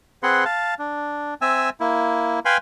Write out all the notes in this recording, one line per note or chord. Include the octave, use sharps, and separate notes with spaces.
C4 G#4 B4 F#5 C6
F5 A5
D4
C4 E5 G#5 E6
A#3 E4
B4 F5 G5 G#5 B5 C6